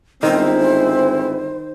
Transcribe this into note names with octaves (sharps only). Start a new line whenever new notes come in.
G1 D#3 G#3 C4 E4 C5